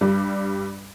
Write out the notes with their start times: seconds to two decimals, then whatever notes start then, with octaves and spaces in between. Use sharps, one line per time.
0.01 G2 G3